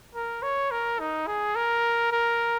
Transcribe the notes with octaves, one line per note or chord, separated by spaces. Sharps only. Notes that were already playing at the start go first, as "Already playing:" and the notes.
A#4
C#5
A#4
D#4
G#4
A#4
A#4